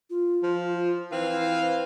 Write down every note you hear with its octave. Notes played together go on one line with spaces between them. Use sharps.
F4
F3
E3 C4 B4 C5 F5